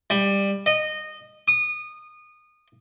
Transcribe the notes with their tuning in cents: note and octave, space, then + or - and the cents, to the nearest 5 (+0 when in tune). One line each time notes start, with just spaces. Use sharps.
G3 +15
D#5 -15
D#6 -25